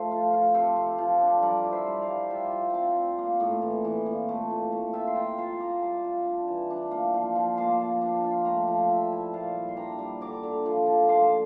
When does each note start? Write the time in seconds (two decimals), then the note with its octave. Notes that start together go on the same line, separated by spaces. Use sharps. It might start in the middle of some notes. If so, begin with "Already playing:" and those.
Already playing: F3 A3 A4 C5
0.11 F4
0.33 F4
0.54 C3 A4 C5
0.76 C3
0.98 F3
1.21 D4
1.42 G3 A#4 D5
1.64 E4
1.72 C5 E5
1.86 G3
2.01 D5 F5
2.08 G3
2.30 F4 E5 G5
2.52 F4
2.70 C4 F5 G5 A5
2.96 C4
3.18 A#3
3.40 A2
3.62 E3
3.85 E3
4.06 A#2
4.29 A3
4.50 A#2
4.72 A3
4.93 F4 E5 G5
5.07 C6
5.15 F4 G5 A#5
5.38 F4 A5 C6
5.60 F4 A#5 D6
5.82 G3 A5 C6
6.04 F4
6.26 D4
6.48 E3
6.70 D4
6.91 A#3
7.14 F3
7.35 F3
7.57 A#3 A5 C6
7.80 F3
8.01 D4
8.24 F4
8.45 A3 G5 A#5
8.68 F3
8.89 F3 E5 G5
9.12 E4
9.33 A#2 F5 A5
9.55 G3
9.68 C6
9.76 D4 G5 A#5
9.99 G3
10.21 D3 A#5 D6
10.43 D3
10.66 F3
10.86 F3
11.08 A#3 A5 C6